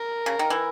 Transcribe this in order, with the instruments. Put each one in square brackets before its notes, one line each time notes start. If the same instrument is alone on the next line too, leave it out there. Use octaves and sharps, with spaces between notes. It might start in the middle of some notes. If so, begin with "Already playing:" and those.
Already playing: [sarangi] A#4
[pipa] C#3
D#3
E3